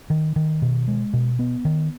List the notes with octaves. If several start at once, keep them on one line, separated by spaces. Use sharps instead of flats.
D#3
D#3
B2
G#3
B2
B3
D#3